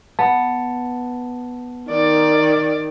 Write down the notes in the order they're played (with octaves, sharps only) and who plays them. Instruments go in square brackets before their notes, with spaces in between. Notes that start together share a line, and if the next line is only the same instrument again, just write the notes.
[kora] B3 [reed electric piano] A5
[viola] D#3 [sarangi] D5